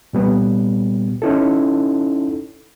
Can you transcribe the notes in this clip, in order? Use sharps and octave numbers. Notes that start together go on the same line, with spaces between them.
A#2 G3 B3
C#4 D#4 E4 A4